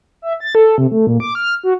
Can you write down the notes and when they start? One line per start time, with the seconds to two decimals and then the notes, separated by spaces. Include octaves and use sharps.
0.22 E5
0.40 A6
0.55 A4
0.78 C3
0.92 A3
1.07 A#2
1.20 D6
1.35 F6
1.64 F#4